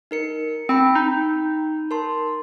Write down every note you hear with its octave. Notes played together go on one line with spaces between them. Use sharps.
D#4 A#4 C#7
C4 G5 B5
D#4
A#4 A5 C6